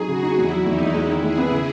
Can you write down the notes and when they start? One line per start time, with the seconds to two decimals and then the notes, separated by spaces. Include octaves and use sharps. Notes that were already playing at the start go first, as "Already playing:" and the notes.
Already playing: F#3 D#4 G#4
0.08 C#3 F#4
0.23 D#4
0.37 E2 E4
0.52 F#3
0.65 E2 D#4
0.80 E2
0.94 G#3 E4
1.08 D#3
1.23 G#3 G#4
1.38 B3
1.51 C#3